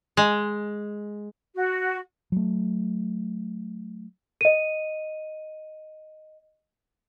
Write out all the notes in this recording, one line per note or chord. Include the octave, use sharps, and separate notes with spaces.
G#3
F#4
F#3 A3
D#5 D#7